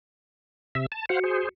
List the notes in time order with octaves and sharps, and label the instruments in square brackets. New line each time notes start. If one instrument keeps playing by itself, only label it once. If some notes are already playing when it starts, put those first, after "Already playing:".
[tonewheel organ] C3 E5
A5
[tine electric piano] F#4 C#7 [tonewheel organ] C5 F5 F#5
[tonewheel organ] G#4 C5